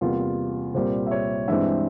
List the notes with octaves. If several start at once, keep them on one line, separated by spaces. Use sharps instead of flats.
E2 C3 G3 A#3 F4
C2 A#2 G3 A#3 C5
E5
C#5
G2 E3 G#3 C4 E5